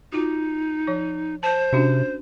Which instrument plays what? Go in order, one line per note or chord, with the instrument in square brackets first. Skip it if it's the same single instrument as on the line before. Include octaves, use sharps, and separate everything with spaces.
[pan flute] D#4 [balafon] F4 F#4
[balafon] F3 C#5
[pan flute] C5 [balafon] A5
[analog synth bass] C3 [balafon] C#4 D4 F#4